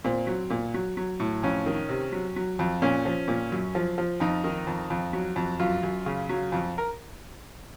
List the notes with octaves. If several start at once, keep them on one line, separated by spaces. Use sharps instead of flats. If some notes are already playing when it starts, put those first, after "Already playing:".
A#2 C4
F#3
A#2
F#3
F#3
A2
F2 C#4
D#3
C3
F#3
F#3
F2
A#2 C#4
F3
A#2
F#2
F3
F3
F2 D#4
D#3
F2
F2
F#3
F2
F#2 F4
F#2
C#3
F#3
F2
A#4